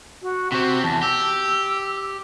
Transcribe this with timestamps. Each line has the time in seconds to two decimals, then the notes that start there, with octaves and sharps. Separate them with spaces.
0.22 F#4
0.52 C3 C4 F#4
0.83 E2 A5
1.02 G4 E6